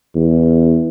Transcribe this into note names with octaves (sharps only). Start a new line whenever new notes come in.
E2